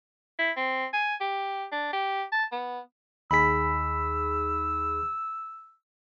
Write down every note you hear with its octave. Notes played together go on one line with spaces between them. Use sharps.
E4
C4
G#5
G4
D4
G4
A5
B3
D#2 D#4 G#4 B5 E6 B6